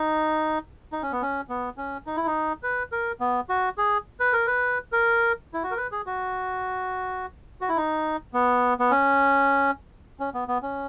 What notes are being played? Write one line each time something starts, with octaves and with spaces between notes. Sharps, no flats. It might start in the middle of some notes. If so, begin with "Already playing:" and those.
Already playing: D#4
D#4
C#4
B3
C#4
B3
C#4
D#4
E4
D#4
B4
A#4
B3
F#4
G#4
B4
A#4
B4
A#4
E4
F#4
A#4
B4
G#4
F#4
F#4
E4
D#4
B3
B3
C#4
C#4
B3
B3
C#4